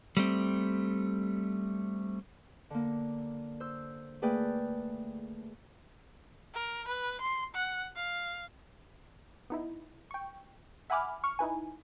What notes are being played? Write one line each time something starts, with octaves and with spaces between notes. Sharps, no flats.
G3 A3 C4
D3 A#3
C5 E6
A3 A#3 G#4 B4 D5 G5
A#4
B4
C6
F#5
F5
B3 D#4 E4
G5 C#6
E5 F#5 G#5 B5 D6 F6
C#6 F6 C#7
D#4 E4 B4 G#5